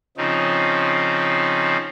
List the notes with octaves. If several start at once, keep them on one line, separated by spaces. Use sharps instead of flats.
C#3 F3 C4 D#4